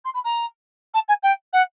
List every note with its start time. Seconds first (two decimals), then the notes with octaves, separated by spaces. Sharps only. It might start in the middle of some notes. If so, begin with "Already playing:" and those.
0.05 C6
0.14 B5
0.24 A#5
0.94 A5
1.08 G#5
1.23 G5
1.53 F#5